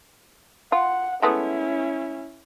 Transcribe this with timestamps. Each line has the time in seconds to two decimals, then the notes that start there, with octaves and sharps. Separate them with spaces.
0.72 F4 F#5
1.22 G#3 A3 B3 C#4 E4